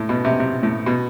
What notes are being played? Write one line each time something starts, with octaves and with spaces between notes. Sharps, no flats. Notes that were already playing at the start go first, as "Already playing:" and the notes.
Already playing: A2
B2
C3
C3
A2
B2